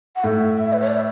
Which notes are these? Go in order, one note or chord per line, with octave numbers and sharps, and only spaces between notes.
F#5
A2 E5
B4
C#5
D5
E5